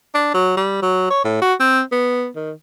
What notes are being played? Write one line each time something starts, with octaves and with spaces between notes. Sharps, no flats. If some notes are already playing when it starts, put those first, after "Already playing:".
D4
F#3
G3
F#3
C#5
A2
F#4
C4
B3
D#3